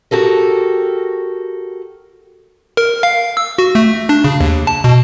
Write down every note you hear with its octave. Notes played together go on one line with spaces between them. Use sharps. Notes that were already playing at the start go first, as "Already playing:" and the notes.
F#4 G4 A4 A#4
A#4
F5
E6
F#4
A3
D4
C#3
D#2
A5
B2